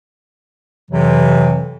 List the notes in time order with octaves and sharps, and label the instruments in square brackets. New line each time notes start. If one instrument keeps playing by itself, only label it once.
[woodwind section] F2 C3 E3 F#3